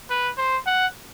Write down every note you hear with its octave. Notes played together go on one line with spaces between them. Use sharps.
B4
C5
F#5